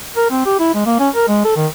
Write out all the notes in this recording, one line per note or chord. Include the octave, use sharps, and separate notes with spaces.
A#4
C4
G4
E4
G#3
A#3
C#4
A#4
G#3
A4
D#3